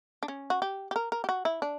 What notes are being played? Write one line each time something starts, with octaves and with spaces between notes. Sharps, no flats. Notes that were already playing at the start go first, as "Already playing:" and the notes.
D4
C#4
F#4
G4
G4
A#4
A#4
G4
F#4
E4
D4